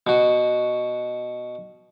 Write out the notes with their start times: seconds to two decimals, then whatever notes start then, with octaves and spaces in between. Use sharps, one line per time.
0.07 B2 F#4